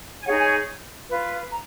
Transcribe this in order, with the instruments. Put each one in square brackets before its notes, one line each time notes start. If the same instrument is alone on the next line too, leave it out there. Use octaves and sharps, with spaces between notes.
[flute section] G#5
D#4 G#4 C#5 F#5
G#5
F4 B4
A#5